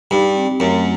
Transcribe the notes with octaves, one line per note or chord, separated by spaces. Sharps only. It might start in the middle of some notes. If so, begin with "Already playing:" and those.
G2 D#4
C4
F#2 A3